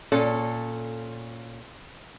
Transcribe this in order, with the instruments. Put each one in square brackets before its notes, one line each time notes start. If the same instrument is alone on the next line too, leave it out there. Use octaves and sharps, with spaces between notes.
[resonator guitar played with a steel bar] A#2 C#4 A4